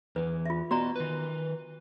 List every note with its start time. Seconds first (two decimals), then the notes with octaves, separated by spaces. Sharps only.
0.16 E2 E3 B4
0.46 F4 E5
0.71 B3 F#4 D5 D#5 A#5
0.96 D#3 B4